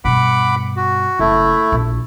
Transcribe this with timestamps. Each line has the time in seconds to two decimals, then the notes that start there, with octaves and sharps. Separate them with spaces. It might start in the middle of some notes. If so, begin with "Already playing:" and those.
0.05 G2 B2 F#5 B5 D6
0.76 F#4
1.19 F#1 A3 E4
1.72 A#1